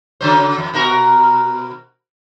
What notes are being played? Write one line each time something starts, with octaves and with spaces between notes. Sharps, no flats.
C#3 F#3 C5
F2
B2 F#4 A#4